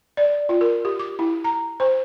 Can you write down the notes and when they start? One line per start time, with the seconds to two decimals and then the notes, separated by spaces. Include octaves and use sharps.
0.17 D5
0.49 F4
0.61 A#4
0.85 G4
0.99 D6
1.19 E4
1.44 A#5
1.80 C5